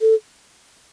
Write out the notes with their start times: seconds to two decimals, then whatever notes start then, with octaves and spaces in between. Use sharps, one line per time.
0.01 A4